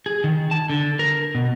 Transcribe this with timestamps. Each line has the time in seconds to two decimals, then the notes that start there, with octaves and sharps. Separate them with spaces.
0.06 G#4
0.24 D#3
0.51 A5
0.70 D3
0.99 A#4
1.35 B2